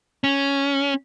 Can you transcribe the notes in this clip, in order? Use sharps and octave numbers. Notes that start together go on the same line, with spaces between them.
C#4